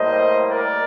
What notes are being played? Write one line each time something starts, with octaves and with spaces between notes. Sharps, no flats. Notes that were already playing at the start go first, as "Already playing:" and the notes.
Already playing: A2 G3 A#3 C5 D#5
A#4 D5